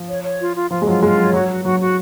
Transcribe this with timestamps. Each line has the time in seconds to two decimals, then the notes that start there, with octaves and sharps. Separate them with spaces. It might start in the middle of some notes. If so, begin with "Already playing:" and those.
Already playing: F3
0.09 C#5
0.24 C#5
0.40 F4
0.55 F4
0.70 F3 F4
0.82 G#3
0.87 F#3 F4
1.02 G#3 F4
1.17 F#3 C#5
1.33 F#3 F#4
1.49 F#4
1.65 F#3 F#4
1.80 F#4